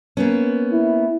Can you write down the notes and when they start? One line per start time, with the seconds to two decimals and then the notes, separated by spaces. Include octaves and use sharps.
0.17 A#3 B3 C#4
0.73 E4